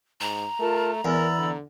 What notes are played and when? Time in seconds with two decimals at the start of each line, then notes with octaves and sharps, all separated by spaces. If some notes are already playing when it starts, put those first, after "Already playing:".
0.21 G#2 A#5
0.59 A3 F4 A#4 A5
1.05 E2 A#4 D5 B5 E6
1.38 D3